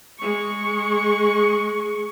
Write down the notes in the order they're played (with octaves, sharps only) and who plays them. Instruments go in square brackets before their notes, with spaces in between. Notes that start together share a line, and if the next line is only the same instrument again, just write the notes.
[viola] G#3 C#6